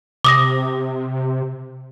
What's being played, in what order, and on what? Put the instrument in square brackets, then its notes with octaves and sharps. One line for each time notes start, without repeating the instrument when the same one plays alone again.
[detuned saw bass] C3 [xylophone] D6 D#6 A#6